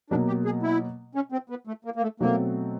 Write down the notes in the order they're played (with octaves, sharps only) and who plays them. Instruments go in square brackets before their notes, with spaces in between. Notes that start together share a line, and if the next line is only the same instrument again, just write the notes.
[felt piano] B2 F#3 A#3 [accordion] D4
[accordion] G4
G#4
E4
C#4
C4
B3
A3
A#3
A#3
A3
[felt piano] B2 F#3 A3 C4 [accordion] A#3